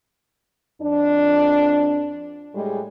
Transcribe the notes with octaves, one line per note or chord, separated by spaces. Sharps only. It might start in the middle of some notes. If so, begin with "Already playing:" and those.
F2 D4
A2 G3 G#3